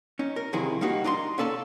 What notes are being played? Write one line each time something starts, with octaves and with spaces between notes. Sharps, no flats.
C#4 D#4
A#4
C2 C3 D#3 F3 E4 G#4
G3 A#3 D#4 F#4
D4 D#4 A#5 C6
A#3 C#4 A4 D5 A5